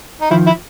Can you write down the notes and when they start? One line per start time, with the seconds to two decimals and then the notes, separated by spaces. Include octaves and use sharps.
0.21 D#4
0.30 D#3 F3 E4
0.46 E4